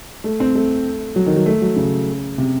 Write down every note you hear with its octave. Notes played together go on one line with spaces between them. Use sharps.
A3
C4
A3
F#3
D#3
F#3
A3
F#3
C#3
C3